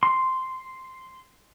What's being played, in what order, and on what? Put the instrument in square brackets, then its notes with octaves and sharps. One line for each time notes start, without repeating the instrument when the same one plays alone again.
[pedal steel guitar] C6